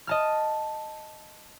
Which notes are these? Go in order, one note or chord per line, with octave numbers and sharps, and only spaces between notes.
D#5 A5 F6